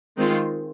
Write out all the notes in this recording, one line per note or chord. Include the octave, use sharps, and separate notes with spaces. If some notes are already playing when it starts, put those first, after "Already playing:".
D#3 G#3 C4 F4